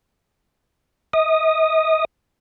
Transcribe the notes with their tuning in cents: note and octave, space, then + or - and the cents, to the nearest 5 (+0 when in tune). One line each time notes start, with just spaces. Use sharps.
D#5 +45 D#6 -10